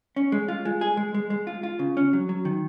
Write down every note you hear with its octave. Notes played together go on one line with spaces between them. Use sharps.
C#4
G#3
F4
G#3
G#4
G#3
G#3
G#3
F4
F4
C#3
C#4
F#3
F#3
D#3